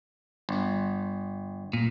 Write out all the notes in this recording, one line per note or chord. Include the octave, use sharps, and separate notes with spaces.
G1
A#2